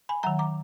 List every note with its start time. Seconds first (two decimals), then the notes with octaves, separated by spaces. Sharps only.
0.09 G#5 B5
0.23 D#3 F#3 F#5 A#5
0.39 A#5 D6